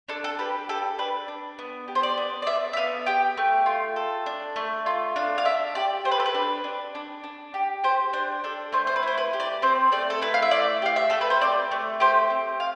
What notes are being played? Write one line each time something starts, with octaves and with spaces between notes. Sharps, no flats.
D4 A4
A4
G4 B4
G4 A4
D4 B4
D4
B3
G4
C5
D5
B3
D5
D4 E5
E5
B3 F5
G4 G5
A3
F4
A4
D4
A3
F4
D4 F5
F5
D4 E5
G4 D5
G4 C5
B4
A4
B4
D4
D4
D4
D4
G4
G4 C5
D4 C5
D4 A4
A3 C5
C5
B4
E4 C5
B4
G4
D5
C4 C5
A3 D5
A4
E4 B4
F5
E5
A3 D5
G4 F5
E5
A3 A4
B4
C5
C4 D5
A3
G4 C5
C4
F5